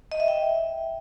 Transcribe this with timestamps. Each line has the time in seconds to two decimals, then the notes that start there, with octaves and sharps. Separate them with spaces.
0.12 D#5
0.20 E5
0.28 G5